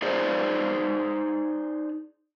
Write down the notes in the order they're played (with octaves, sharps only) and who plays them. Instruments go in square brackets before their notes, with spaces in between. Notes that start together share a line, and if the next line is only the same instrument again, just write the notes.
[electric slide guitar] D#4 G#4 C5 D5